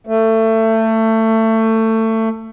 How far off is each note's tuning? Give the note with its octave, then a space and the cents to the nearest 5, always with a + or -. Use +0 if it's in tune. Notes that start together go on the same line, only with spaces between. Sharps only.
A3 +20